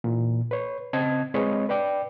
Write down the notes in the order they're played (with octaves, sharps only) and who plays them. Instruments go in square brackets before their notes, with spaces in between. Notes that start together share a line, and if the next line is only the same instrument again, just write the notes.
[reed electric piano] A#2 E3
B4 C#5
C#3 C4 D#5 A5 G#6
G#3 C4 B4 C#5 D#5
B4 D5 G5 D6